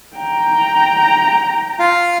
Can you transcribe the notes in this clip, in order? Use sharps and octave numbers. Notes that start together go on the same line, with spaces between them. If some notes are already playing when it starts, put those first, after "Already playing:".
G5 A#5
F4 F5